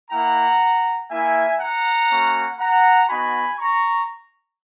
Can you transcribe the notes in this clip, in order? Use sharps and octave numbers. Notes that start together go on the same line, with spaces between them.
A#3 E4 F#5 A#5
A#3 E4 E5 G#5
F#5 A#5
A#3 C#4 F#4
F#5 A#5
B3 D#4 F#4 G#5 B5
A#5 C#6